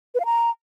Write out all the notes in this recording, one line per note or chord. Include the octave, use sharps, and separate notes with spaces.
B4
F5
A#5